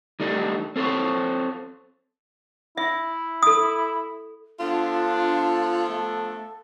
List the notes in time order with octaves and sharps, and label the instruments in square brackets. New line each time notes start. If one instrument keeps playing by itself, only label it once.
[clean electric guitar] D#3 G3 A3 D4 D#4
C4 A4 A#4 C5 C#5
[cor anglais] E4 [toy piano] E5
[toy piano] A4 D#6
[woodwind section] F3 B3 D4 [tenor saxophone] F4 [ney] A4
[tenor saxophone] A3